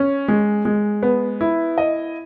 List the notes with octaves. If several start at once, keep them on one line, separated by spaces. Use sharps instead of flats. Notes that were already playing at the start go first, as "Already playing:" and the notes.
Already playing: C#4
G#3
G#3
B3
E4
D#5